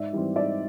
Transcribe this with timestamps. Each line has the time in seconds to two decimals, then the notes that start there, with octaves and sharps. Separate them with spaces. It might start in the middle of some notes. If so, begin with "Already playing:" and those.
Already playing: G#2 D5 E5
0.13 E3 G3 C4
0.36 G#2 D5 E5